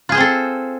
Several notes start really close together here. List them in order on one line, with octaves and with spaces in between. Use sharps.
F4 G#4 C5 C4 A4